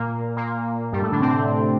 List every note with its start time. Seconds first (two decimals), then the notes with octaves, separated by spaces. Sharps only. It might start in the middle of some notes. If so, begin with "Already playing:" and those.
Already playing: A#2 A#3
0.36 A#2 A#3
0.92 G2 G3
1.02 A2 A3
1.11 D3 D4
1.20 C3 C4